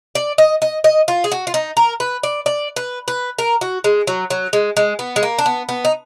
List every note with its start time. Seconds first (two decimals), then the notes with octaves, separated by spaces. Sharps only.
0.15 D5
0.38 D#5
0.62 D#5
0.84 D#5
1.08 F4
1.24 G#4
1.32 F#4
1.47 F4
1.54 D#4
1.77 A#4
2.00 B4
2.23 D5
2.46 D5
2.76 B4
3.08 B4
3.39 A#4
3.61 F#4
3.84 G#3
4.07 F#3
4.30 F#3
4.53 G#3
4.77 G#3
4.99 B3
5.16 G#3
5.23 A#3
5.38 D4
5.46 B3
5.69 B3
5.85 D#4